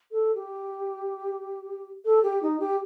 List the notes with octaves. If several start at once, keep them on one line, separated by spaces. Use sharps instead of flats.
A4
G4
A4
G4
D#4
G4